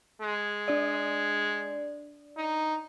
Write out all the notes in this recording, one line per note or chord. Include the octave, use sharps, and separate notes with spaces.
G#3
D4 D5
D#4